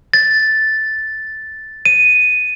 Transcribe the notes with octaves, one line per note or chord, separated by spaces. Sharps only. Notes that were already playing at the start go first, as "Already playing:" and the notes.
A6
D#7